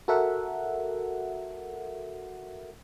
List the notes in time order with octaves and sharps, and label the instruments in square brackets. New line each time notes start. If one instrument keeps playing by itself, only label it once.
[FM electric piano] F#4 A4 A#4 E5 F#5